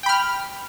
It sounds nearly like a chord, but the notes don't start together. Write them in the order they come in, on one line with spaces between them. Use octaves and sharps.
G5 B5 F6